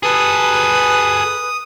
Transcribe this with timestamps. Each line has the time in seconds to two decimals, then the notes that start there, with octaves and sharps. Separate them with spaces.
0.03 G#4 A4 B4 D#6